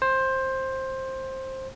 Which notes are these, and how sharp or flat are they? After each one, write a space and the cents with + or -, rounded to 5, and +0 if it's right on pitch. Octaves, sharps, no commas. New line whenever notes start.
C5 +15